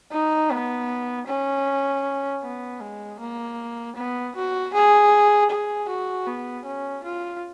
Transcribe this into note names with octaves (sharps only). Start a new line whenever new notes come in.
D#4
B3
C#4
B3
G#3
A#3
B3
F#4
G#4
G#4
F#4
B3
C#4
F4